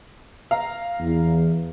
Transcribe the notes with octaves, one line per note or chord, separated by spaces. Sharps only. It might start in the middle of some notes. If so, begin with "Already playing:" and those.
F5 A#5
E2